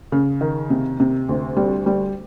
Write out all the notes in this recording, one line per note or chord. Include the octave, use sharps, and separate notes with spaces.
C#3
D#3
C3
C3
D2
G3
G3